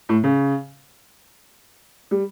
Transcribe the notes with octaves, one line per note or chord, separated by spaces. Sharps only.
A2
C#3
G3